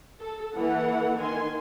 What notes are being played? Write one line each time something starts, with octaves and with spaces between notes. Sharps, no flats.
A4
E3 A#3 A4 F#5
D#3 G#5 C6